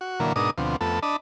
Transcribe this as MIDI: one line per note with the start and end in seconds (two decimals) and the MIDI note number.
0.01 0.19 66
0.20 0.33 46
0.20 0.33 50
0.20 0.33 52
0.20 0.33 54
0.20 0.33 58
0.36 0.50 44
0.36 0.50 47
0.36 0.50 62
0.36 0.50 63
0.36 0.50 70
0.36 0.50 87
0.58 0.76 38
0.58 0.76 47
0.58 0.76 53
0.58 0.76 60
0.81 0.99 41
0.81 0.99 57
0.81 0.99 59
0.81 0.99 69
1.03 1.16 62
1.03 1.16 75
1.03 1.16 81
1.03 1.16 83